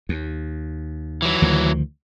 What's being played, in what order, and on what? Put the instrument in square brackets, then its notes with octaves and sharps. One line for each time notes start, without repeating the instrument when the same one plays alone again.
[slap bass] D#2
[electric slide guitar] E3 F#3
[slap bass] D2 D#3 F3